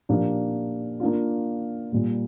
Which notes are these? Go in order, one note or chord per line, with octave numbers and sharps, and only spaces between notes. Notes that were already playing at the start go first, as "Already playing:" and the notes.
A#2 F3 A#3 D4 G4
A#3 D4 F4
A#2 G3 A#3